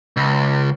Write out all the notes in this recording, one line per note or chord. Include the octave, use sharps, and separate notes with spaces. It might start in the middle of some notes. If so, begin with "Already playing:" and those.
C#2